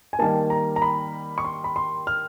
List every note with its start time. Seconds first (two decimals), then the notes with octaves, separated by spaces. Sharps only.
0.13 G#5
0.19 D#3 G3 A#3 A5
0.50 A#5
0.76 A#5
0.82 B5
1.38 C#6
1.44 C6
1.64 B5
1.76 C6
2.07 F6